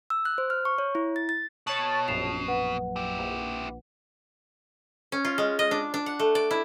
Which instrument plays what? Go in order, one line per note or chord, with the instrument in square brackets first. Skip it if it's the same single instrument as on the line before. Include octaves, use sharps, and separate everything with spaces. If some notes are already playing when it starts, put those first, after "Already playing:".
[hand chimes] E6
F#6
C5
F6
C#6
C#5
E4
A6
A6
[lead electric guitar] B2 [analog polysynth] C#5 A5 [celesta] F#7
[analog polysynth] A#1 F#2 [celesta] C7 E7 F7
[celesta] B4 F#5
[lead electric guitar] E4 G4
[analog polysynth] A#1
[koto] C#4
F4
G#3
D#5
D4
D4
F#5
A3
D5
E4